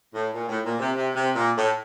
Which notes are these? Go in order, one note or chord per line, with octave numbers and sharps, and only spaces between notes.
A2
A#2
A2
A#2
C3
C3
C3
A#2
A2